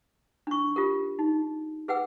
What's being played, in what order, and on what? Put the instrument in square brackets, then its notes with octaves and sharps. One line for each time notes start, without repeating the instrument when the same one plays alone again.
[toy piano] D4 C#6
F4 G4 A#4
D#4
G#4 B4 F#5 G5 E6